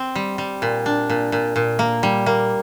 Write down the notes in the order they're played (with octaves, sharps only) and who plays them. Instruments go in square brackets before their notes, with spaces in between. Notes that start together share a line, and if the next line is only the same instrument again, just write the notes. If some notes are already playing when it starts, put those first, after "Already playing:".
Already playing: [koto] C4
G3
G3
A#2
D4
A#2
A#2
A#2
A#3
G3
A#3